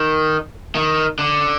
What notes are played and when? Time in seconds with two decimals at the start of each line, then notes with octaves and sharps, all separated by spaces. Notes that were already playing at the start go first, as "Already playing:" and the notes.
Already playing: D#3
0.75 D#3
1.19 D3